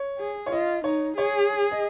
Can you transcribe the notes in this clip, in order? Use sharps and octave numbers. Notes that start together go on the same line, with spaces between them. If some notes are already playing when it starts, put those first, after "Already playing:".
Already playing: C#5
G#4
C#5
F4 D#5
D#4 C#5
G#4 C#5
D#5